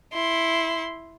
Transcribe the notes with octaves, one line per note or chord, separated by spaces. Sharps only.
E4 C6